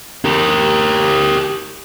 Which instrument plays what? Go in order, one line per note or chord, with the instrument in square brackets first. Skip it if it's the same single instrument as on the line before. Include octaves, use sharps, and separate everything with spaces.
[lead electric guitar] G4 A#4